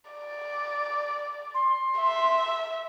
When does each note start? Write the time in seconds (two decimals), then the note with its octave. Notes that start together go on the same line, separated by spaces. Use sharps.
0.11 D5
1.54 C6
1.99 E5